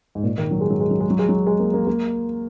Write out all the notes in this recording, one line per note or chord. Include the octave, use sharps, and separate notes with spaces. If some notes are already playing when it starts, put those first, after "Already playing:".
G#2
A#2
D#3
F#3
G#3
F#3
G#3
F#3
G#3
F#3
G#3
F#3
G#3
A#3
A#3
A#3